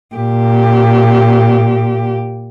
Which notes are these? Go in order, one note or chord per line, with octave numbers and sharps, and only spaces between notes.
A#2 G4